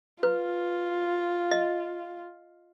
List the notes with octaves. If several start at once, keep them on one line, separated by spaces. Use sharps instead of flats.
F4 B4
D#5